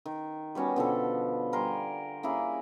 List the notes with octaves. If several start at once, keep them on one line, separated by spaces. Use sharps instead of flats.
D#3
G3 B3 C#4 F#4
B2 D3 F3 A4
G3 A#4 G#5 C6
A#3 C#4 E4 G#4